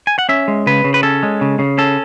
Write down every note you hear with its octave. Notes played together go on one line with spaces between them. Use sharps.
G#5
F#5
C#4 E5
G#3
C#3 B4
C#3
B4
C#4 A4
G#3
C#3
C#3
C#4 A4